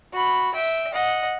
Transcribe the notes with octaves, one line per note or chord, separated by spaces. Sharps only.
F#4 B5
E5 G5
D#5 F#5